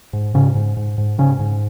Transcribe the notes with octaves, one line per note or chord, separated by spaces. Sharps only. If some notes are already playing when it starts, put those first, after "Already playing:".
G#2
G#2 C#3 C#4
G#2
G#2
G#2
G#2 C#3 C#4
G#2